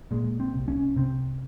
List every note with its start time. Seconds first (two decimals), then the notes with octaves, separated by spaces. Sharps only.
0.11 A#2 G#3
0.40 C4
0.54 C2
0.68 C#4
0.96 C3 C4